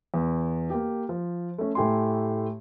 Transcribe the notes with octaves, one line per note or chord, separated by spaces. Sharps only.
E2
A#3 G4
F3
A3 C#4
A2 A3 G4 G#5 C6